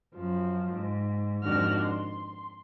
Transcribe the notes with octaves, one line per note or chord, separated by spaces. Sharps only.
F#2 F3
G#2
F2 G#2 D#3 D4 F#4 F6
C6